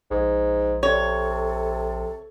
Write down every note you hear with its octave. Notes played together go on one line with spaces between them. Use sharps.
A#1 G#2
C3 A4 C#5